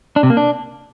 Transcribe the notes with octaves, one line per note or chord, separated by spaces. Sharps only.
D4
C3
A#3
D4